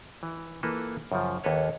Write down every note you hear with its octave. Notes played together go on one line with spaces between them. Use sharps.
E3
E3 A#3 F4 A4 B4
F#2 C#3 F3
D#2 A#3 A4 B4 C#5